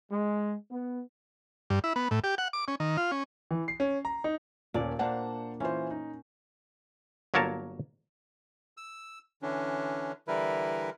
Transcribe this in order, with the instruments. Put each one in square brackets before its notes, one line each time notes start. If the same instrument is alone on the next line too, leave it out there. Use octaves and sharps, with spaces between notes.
[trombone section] G#3
B3
[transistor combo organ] G2
E4
B3
A2
G4
F#5
D6
C#4
D#3
F4
C#4
[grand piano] E3
C7
C#4
A#5
D#4
[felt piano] D#1 C#4 [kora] A#2 D5
[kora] A#3 D4 [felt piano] C5 F#5 A5
[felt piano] E3 F4 C5 [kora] C#4
[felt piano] D#4
[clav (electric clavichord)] G1 F#3 A#3 A#4 C#5 A5
[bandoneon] E6
D3 E3 C#4 D4
D3 E3 G3 E4 A#4 B4